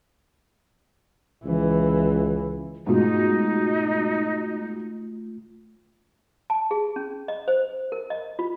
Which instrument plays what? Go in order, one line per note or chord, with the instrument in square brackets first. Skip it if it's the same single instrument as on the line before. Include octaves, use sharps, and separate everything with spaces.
[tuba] C#2 [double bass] E3
[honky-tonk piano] G#2 B2 [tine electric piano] A3 F4 [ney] D#4
[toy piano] A5
G#4
C#4
D#5
C5
A#4
D#5
F4